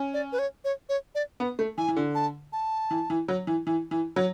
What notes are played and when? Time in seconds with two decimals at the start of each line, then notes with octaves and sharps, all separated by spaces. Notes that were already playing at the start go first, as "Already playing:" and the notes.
Already playing: C#4
0.14 D5
0.32 B4
0.39 C#5
0.64 C#5
0.89 C#5
1.15 D5
1.40 B3
1.59 A3
1.78 E3 G#5
1.88 E3
1.96 D3
2.15 A5
2.53 A5
2.91 E3
3.10 E3
3.28 F#3
3.47 E3
3.67 E3
3.91 E3
4.16 F#3